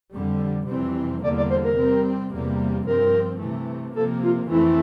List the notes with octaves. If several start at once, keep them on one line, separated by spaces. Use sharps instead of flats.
F2 D3 G3
F2 C3 E3 G3 C4
E2 D3 G3 A#3 D5
D5
C5
A#4
C3 G3 C4
E2 C3 G3 A#3
G2 F3 C4 A#4
C3 E3 A3
C3 F3 A#3 A4
F4
F2 E3 A3 C4 E4